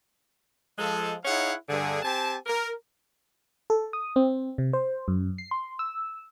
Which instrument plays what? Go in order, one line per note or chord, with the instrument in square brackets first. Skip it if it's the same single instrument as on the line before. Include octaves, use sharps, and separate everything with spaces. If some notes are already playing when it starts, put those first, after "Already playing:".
[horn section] F3 G#3 A4
D#4 E4 G#4 C#5 F5 F#5
G2 D3 G#4
C4 G4 G#5 A5
A#4
[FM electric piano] A4
D#6
C4
C3
C5
F#2
C7
C6
E6